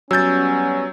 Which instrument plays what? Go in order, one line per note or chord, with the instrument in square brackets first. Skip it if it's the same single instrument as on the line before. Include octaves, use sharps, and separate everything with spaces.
[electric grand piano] F#3 G6 [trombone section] G3 B3 C#4 [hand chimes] E6 A6